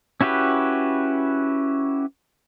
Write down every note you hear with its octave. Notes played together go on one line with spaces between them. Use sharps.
C#4 E4 F#4 G4 B4